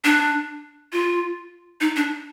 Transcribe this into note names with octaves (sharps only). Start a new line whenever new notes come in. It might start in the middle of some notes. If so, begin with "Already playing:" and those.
D4
F4
D#4
D4